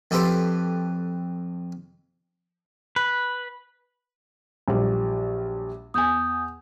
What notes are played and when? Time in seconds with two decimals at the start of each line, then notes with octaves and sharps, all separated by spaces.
0.11 F2 G4 A4 B4 C6 D6
2.96 B4
4.68 A#1 F#3 G3
5.94 E2 G#5 D#6 G6